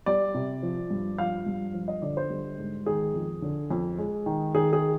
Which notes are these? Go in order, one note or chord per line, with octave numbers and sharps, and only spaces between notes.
G3 D5
C3
F3
G2
F3 F5
G2
F3
D#5
D3 D5
C5
G3
G#2
D#3 G#4
F2
D3
F2
G#3
D#3
D#3 G#4
G#4